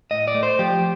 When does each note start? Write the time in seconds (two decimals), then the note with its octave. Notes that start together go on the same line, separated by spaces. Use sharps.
0.11 A2 D#5
0.28 D5
0.35 A3
0.43 C5
0.59 F3 G4